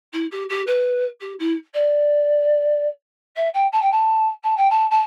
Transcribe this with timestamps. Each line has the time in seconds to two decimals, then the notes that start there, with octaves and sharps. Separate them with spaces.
0.13 E4
0.31 G4
0.49 G4
0.66 B4
1.20 G4
1.39 E4
1.74 D5
3.36 E5
3.54 G5
3.72 A5
3.82 G5
3.92 A5
4.43 A5
4.57 G5
4.70 A5
4.90 A5